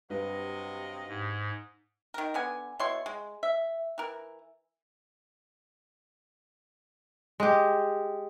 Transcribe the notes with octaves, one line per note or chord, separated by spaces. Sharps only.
G2 C3 F#3 B4 D#5
G#2
D#3 A#4
D3 B3 G#5
B2 E4 C#5 C6
G#3
E5
E3 A#4
G#3 G4